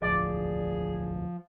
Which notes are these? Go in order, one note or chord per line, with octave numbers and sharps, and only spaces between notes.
E1 A1 D2 F3 G#4 D5